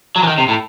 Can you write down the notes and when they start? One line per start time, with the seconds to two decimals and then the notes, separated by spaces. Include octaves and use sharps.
0.16 F#3
0.23 E3
0.27 D#3
0.38 C3
0.48 A2